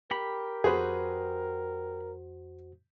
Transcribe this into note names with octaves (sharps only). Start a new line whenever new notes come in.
G4 A#4 B5
F2 F#4 G#4 B4 C5